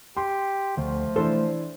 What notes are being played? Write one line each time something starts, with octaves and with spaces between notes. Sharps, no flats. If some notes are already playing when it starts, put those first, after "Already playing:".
G4 C6
D2 F3 A3
E3 D4 A4 C5